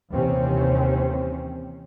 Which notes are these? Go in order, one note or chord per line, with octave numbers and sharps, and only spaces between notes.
D#2 C3 E3 C4 C#4